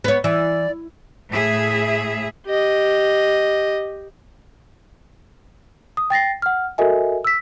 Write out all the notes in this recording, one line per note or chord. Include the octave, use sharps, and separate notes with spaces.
B3 C#5
E3 D5
A2 G#4 E5
G4 D#5
D#6
G5 A6 A#6 C7
F#5 F6
F#4 A4 A#4 D#5 E5 G#5
E6 B6